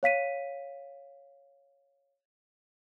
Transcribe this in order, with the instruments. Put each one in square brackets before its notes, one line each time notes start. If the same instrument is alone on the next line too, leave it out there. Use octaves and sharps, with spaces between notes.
[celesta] C#5 F5 B6 D#7